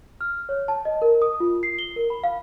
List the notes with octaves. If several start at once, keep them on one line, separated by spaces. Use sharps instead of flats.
F6
C#5
A5
D#5
A#4
D#6
F4
C7
G7
A#4
B5
F5